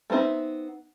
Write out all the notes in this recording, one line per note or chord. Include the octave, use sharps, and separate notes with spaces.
A3 B3 C4 D#4 E5